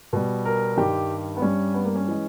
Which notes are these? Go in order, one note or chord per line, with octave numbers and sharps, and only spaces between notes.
B2 G3
A#4
G2 D#3 G3 G4
B3
G2 G3 C#4
B3
A#3
C#4
E3 G#3